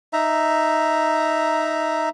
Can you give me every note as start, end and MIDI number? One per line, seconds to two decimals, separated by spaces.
0.13 2.09 63
0.13 2.09 76
0.13 2.09 82